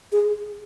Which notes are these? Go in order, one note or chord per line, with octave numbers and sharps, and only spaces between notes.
G#4